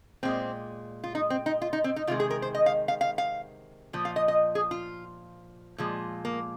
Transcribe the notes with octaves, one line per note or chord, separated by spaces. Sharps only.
A#2 G#3 C4
F4
D#4
C4
D#4
F4
D#4
C4
D#4
C3 D#3 G#3 F4
G#4
A#4
C5
D#5
F5
F5
F5
F5
A#2 F3
F5
D#5
D#5
G#4
F4
A#2 F3 G#3
A#3